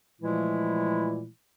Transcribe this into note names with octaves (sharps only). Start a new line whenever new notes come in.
A#2 E3 F3 G#3 A3 E4